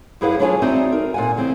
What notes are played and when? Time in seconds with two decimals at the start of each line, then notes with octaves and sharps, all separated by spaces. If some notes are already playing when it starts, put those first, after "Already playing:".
0.21 F#2 E4 G#4 B4 F5 F#5
0.39 F#3 D4 F4 C#5 F#5 G#5
0.62 C4 D#4 F#4 D5 E5
0.92 A#4
1.14 A#2 F#5 G#5
1.36 C#3 E3 C4